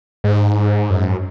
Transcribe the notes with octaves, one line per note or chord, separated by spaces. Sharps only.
G#2
F#2